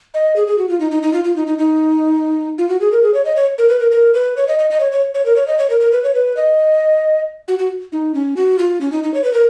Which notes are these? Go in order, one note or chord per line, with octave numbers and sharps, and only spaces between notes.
D#5
G#4
G#4
F#4
F4
D#4
D#4
D#4
F4
F4
D#4
D#4
D#4
F4
F#4
G#4
A#4
G#4
C#5
D#5
C#5
A#4
B4
A#4
A#4
B4
C#5
D#5
D#5
D#5
C#5
C#5
C#5
A#4
C#5
D#5
C#5
A#4
A#4
B4
C#5
B4
D#5
F#4
F#4
D#4
C#4
F#4
F4
C#4
D#4
D#4
C#5
B4
A#4